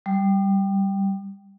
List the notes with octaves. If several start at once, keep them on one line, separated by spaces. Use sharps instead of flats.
G3